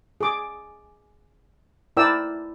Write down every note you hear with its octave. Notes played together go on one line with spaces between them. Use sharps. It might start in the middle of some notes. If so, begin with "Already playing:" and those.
G#4 D6
E4 A#4 D5 G5 E6